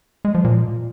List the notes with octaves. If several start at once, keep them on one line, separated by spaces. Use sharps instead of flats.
G#3
F3
A#2